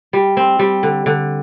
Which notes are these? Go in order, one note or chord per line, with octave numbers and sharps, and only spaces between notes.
G3
C4
G3
D3
D3